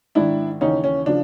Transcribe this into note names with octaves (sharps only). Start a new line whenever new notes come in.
G#2 D#3 D4 E4
D#2 C#3 E3 C#4 D#4
C#4
C#3 F3 D4